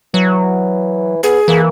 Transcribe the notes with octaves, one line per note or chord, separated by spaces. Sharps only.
E3 F#3
B3 G#4
E3 A#3